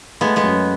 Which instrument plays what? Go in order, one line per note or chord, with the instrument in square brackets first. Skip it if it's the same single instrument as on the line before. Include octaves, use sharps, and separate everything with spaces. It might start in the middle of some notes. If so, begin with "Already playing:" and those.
[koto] G#3 B3 [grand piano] A3
[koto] G#3 B3
[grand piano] F#2